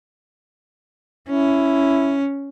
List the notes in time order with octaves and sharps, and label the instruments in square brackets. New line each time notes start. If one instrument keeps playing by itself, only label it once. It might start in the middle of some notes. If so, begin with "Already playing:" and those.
[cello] C#4 [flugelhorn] E4